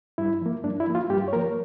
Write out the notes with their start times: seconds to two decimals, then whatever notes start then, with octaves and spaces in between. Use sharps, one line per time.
0.18 G2 E4
0.42 F3 A#3
0.64 G2 D4
0.80 E4
0.87 F3 A#3
0.95 F4
1.10 G2 G4
1.28 C#5
1.33 A#3 A#4
1.36 F3